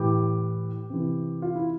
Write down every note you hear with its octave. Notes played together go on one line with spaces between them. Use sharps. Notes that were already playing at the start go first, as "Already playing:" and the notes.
Already playing: A2 E3 G4
C3 E3
F4
E4